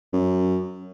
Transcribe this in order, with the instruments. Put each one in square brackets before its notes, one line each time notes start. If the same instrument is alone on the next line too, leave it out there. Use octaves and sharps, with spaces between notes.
[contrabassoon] F#2